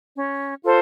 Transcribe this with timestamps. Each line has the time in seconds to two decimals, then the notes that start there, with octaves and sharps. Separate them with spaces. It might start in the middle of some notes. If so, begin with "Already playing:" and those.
0.15 C#4
0.62 F4 A4 C5